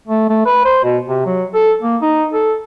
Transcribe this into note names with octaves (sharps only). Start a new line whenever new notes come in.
A3
A3
B4
C5
B2
C3
F#3
A4
A#3
D#4
A4